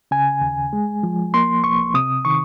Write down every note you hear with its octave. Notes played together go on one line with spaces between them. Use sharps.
C#3 G#5
D#2
G#3
F3
A#3 C6
C2 C#6
C3 D#6
D#3 C#6